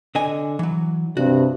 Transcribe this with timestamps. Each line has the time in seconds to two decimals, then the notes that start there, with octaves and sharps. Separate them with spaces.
0.15 D3 D#5 G#5
0.59 E3 F#3
1.17 G2 C3 F#4